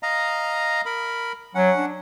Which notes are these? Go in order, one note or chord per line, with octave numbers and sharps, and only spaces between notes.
D#5 F5 A#5
A#4 B5
F#3 C#4 F#5
D4